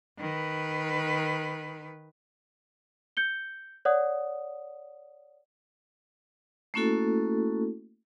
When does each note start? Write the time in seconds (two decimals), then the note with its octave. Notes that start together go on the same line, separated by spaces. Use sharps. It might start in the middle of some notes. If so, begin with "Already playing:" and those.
0.19 D#3 B4
3.17 G6 C#7 G7
3.85 C#5 D5 F#5 D#6
6.74 A3 A#3 C#4 E4 F#4 A4